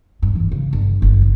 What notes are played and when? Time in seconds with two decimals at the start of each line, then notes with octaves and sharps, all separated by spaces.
0.22 G2
0.35 E3
0.52 C#3
0.73 G1
1.02 G1
1.22 C#3